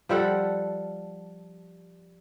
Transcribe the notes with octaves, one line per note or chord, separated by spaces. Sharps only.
F3 G3 A4 F#5